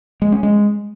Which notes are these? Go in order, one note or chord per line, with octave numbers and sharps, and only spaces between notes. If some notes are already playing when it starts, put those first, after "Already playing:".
G#3
C#4
G#3